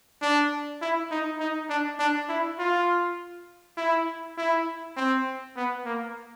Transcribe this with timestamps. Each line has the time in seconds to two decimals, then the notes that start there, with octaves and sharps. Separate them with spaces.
0.22 D4
0.81 E4
1.11 D#4
1.40 D#4
1.70 D4
1.99 D4
2.29 E4
2.59 F4
3.77 E4
4.37 E4
4.97 C4
5.56 B3
5.85 A#3